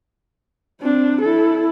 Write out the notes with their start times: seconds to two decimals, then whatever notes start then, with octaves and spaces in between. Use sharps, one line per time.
0.81 C4 D4
1.21 E4 A4